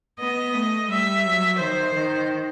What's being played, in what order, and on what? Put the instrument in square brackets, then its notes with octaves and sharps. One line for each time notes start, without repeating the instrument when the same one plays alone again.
[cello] B3 [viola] D#5
[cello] A3
[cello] G3 [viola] E5
[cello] F#3
[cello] D#3 [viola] C5
[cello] D#3